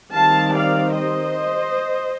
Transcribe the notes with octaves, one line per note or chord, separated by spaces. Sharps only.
D#3 G3 C4 F5 A5
D5 F5
C5 D#5